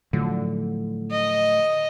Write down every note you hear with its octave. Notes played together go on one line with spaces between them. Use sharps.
A2 D3 F3 F#3
D#5